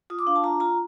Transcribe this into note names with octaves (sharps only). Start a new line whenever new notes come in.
F4 D#6
D6
D4 F5
A5
F4 A#5
F4 A#5